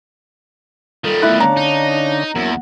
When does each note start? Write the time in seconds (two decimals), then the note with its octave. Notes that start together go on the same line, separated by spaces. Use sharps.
1.04 D#3 G3 F4 A4
1.22 A3 B3 E4 F#6
1.40 D3 C#4 D4 C#5 F5 A5 A#5
1.57 D#4
2.35 E2 F#3 A#3 C#4 A#4 F#5